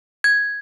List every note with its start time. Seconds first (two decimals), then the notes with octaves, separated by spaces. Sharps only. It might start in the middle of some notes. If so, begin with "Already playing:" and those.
0.24 G#6